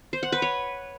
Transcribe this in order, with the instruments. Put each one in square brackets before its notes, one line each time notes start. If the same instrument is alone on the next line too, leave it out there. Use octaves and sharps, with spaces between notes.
[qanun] C5
F#5
B4
C#5